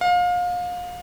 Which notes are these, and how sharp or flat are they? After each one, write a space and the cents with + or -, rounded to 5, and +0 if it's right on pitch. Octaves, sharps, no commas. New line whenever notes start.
F5 +30